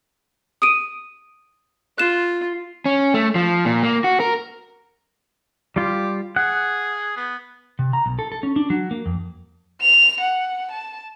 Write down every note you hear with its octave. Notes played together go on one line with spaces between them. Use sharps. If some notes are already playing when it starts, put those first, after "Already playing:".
D#6 D7 D#7
F4 F#6 E7
C#4
A3
F3
A#2
A#3
F#4
A#4
G3 F4 G4
G#4 F#5
B3
C3
A#5
B1
A4
A4
C#4
D4
F#3
A#3
F2
F7
F#5
A5